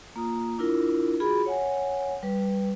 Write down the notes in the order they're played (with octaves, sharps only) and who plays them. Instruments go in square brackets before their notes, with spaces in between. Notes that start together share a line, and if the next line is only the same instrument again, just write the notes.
[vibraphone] A#3 F4 A#5 D#6
D4 E4 F4 A#4
F4 F#4 G#4 B5
C#5 F#5 G#5
G3 B4